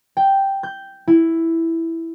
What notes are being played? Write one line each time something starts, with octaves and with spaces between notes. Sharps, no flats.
G5
G6
E4